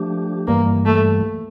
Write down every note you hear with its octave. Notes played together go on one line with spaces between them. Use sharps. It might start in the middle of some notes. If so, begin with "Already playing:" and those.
Already playing: F3 A3 D4 G4
G2 E3 G3 A#3
A3